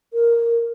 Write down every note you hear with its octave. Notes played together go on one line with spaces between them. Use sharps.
A#4